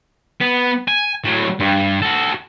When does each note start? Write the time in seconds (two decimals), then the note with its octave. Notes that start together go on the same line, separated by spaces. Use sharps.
0.41 B3
0.88 G#5
1.24 A2 F#3
1.60 G2
2.02 F#4 A4